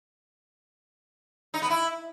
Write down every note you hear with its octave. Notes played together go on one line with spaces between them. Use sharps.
D#4
B3
E4